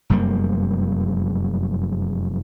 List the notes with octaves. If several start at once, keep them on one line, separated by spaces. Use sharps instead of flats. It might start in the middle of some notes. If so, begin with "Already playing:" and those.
F1 F#2 G3 A#3